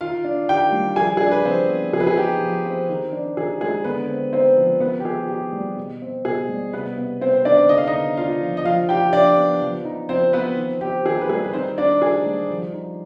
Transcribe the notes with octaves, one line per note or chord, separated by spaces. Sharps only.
D#3 F4 F5
D4
D#3 G4 G5
G3
F3 G#4 G#5
D4 G#4
B4
F3 C4 C5
B3
F3 G#4
B4
G#4
D#4 G4
F3
C4
D#3
D4
D#3 G#4
G#3 G#4
D3 B3 B4
C4
C4 D#4 C5
F3
D#3 B3 B4
G4
C4 G#4
D#4 G4
G3
B2
C4
B2 G#4
G3
C3 B3 B4
B3
C3 C4 C5
C5
D#3 D4 D5
D3 D#5
F5
D#4 D#5
B3
D4 F4 F5
F3
D#5
F3 F4 F5
D#4 G4 G5
F3 D4 D5
B3
F3
D#4
F3 C4 C5
B3 C4 B4
D#3
C4 G4
D#3 G#4
B4
G3 G#4
B4
D#3 C4 C5
C4 D4 D5
D#4 G#4 G#5
G3
F3
D#4